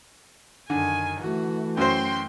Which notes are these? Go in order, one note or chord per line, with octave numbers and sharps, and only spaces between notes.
F#2 D3 D#3 G#5
E3 A3 F#4
F#2 F#4 C5 G5 C6